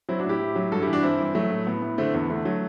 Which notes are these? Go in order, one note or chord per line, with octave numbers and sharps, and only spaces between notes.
F#3 C4 E4
D4 F#4
A2
E4 G4
A2
F#3
G2 F#4 A4
E4 G4
E3
D4 F#4
G2 C4 E4
E3
F#3 A3
A2
A2 B3
A2
D3 A3 C4
E2 B3
D3 A3
F#3